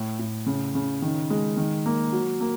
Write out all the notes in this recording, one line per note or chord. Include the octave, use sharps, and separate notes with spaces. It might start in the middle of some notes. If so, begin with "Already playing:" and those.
Already playing: A2
A2
C#3
C#3
D#3
G#3
D#3
A#3
F#3
A#3